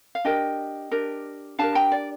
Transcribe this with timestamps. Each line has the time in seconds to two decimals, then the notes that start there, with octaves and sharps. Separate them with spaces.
0.15 F5
0.25 D4 G4 A#4 D#5 G5
0.91 D4 G4 A#4
1.59 D4 G4 A#4 F5 A5
1.75 G5 A#5
1.92 D5